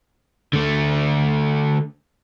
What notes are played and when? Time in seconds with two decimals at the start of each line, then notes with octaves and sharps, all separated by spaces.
0.53 D3 A3